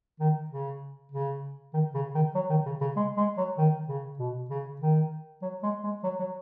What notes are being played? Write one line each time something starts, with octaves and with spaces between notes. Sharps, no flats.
D#3
C#3
C#3
D#3
C#3
D#3
F#3
D#3
C#3
C#3
G#3
G#3
F#3
D#3
C#3
B2
C#3
D#3
F#3
G#3
G#3
F#3
F#3